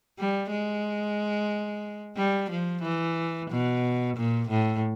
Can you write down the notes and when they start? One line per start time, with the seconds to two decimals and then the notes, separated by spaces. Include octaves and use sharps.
0.18 G3
0.51 G#3
2.16 G3
2.50 F3
2.82 E3
3.50 B2
4.16 A#2
4.49 A2